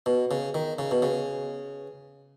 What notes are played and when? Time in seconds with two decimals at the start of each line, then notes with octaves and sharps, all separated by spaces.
0.06 B2
0.31 C#3
0.54 D#3
0.79 C#3
0.91 B2
1.02 C#3